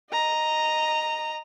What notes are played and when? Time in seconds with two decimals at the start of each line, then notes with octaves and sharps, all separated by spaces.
0.12 D#5 A#5